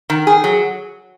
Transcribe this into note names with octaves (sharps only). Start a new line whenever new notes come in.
D#3
G#4
F#3